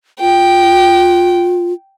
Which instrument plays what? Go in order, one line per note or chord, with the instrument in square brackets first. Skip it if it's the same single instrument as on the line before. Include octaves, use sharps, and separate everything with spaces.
[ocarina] F4 [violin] G5